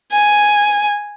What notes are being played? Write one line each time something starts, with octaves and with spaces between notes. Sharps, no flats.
G#5